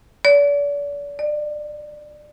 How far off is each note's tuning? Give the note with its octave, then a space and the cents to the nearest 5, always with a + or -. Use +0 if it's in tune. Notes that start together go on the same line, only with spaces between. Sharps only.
D5 -40
D5 +25